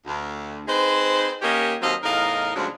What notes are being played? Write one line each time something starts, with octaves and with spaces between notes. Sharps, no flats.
D2
C4 D#4 G#4 B4 C5
D#2 A#3 C#4 G4 D#5
D#2 F#3 C4 A4 D#5 F5
E2 A2 D#4 A#4 D#5 F5
D2 C#3 F3 F#3 G#3 D4